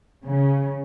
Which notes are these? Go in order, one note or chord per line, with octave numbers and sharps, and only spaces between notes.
C#3